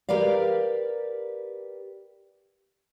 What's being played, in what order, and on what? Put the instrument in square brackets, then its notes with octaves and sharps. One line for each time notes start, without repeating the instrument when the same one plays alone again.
[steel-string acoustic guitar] G4 A#4 B4 D5 F5